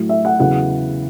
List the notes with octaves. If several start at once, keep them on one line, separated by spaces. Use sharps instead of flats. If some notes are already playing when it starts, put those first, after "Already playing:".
Already playing: A2 F#3
E5
F#5
E2 C#3 F#3 F#5